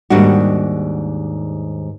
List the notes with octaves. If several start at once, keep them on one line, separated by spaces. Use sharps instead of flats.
D#2 G#2 G3 D4 F#4